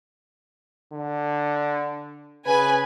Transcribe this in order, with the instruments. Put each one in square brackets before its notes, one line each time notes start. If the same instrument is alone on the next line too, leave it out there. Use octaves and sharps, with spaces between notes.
[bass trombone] D3
[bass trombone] C#3 [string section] B4 G#5